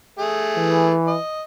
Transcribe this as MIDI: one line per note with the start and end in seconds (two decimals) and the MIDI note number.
0.19 0.93 57
0.19 0.93 68
0.58 1.16 52
1.07 1.42 75